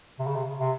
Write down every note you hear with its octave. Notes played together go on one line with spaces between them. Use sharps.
C3
C#3
C3
C3